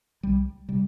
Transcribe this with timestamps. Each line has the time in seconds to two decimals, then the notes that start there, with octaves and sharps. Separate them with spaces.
0.23 C2 G3
0.69 C3 G3